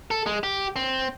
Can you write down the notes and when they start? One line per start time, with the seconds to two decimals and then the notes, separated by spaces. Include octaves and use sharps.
0.11 A4
0.26 G#3
0.43 G4
0.76 C4